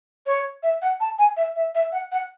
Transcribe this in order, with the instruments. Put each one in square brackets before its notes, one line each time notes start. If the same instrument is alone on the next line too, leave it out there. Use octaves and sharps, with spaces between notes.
[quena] C#5
E5
F#5
A5
G#5
E5
E5
E5
F#5
F#5